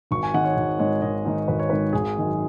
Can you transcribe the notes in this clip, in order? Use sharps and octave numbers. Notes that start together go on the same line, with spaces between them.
G#1 C#6
G#5
G#2 D#3 G#3 F#5
C#5
G#1
G#2 D#3 G#3 C#5
G#1 D#5
G#2 D#3 G#3
G#1 B4
C#5
G#2 D#3 G#3 B4
G#1 G#4
F#2 D#3 G#3